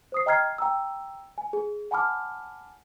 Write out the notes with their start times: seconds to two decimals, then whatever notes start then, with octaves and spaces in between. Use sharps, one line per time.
0.12 C5 D#6 C7
0.26 D#5 G5 A#5 F6 G#6 C7
0.58 G5 A#5 E6
1.38 G#5
1.53 G#4
1.91 F#5 G#5 A5 B5 D6 F6